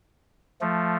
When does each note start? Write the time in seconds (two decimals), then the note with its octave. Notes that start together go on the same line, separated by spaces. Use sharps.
0.61 F3 A3